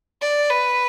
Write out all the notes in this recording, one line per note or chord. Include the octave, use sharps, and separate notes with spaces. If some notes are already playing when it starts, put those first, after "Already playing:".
D5
B4